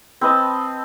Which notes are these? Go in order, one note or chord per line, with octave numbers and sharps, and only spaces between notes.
C4 B4 D#5 A5